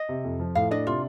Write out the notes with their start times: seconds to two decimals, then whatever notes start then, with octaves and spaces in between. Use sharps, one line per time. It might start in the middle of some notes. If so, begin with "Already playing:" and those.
Already playing: D#5
0.09 C3
0.24 F2
0.40 F3
0.55 A2 F5
0.71 D4 D#5
0.87 C3 F4